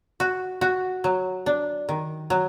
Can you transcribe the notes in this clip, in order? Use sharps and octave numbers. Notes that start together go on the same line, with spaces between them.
F#4
F#4
F#3
D4
D#3
F#3